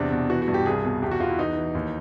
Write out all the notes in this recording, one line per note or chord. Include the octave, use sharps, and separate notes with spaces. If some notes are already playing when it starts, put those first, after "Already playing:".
Already playing: E2 C3 D4
B2
E3 F#4
F#4
G2
G4
C2 G#4
B2
E2 G4
F#4
E2 F4
E4
E3 D#4
E3
D#2